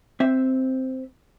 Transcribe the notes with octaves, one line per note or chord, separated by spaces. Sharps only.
C4 E5